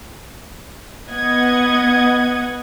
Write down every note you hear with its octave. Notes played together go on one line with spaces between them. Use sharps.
B3 D#5 F#5 G#6